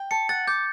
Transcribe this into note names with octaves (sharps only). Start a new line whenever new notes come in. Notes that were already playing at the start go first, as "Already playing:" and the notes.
Already playing: G5
A5 C#7
F#5 A6
D6 G6